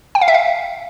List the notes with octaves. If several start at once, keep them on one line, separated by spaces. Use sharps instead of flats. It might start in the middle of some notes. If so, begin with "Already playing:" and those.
G5
F5
E5
F5